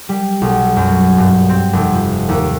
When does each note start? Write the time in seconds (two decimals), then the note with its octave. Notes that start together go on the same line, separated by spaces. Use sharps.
0.09 G3
0.42 B1
0.76 F#2
1.18 G2
1.49 C4
1.73 F1
1.94 F3
2.29 D#2